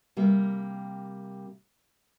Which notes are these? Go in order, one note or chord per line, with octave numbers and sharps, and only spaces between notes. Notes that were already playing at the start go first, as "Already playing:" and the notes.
C3 G3 A#3